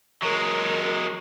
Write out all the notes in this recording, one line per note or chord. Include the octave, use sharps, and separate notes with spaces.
F#3 G#3 A#4